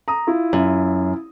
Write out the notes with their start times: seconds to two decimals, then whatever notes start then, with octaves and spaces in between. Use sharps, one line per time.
0.08 A#5 D#6
0.27 E4 F4
0.53 F#2